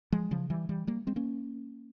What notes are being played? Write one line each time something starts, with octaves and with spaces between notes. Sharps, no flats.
F3 G#3
C#3 F3
E3 G3
E3 G3
G3 A#3
G#3 C4
A#3 C#4